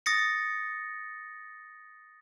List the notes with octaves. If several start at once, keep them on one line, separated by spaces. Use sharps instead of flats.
D#6 A6 A#6 C#7